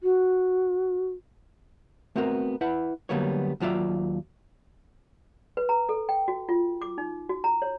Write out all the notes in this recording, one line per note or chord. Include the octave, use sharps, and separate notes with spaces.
F#4
A3 B3 C4 F#4 A#4
E4 B4 F#5
D3 F#3 G3 A#3 B3 C#5
D#2 F#3 F4 D5 E5
B4
A#5
A4
G5
F#4
F4
D6
D#4
F#4
A#5
C#5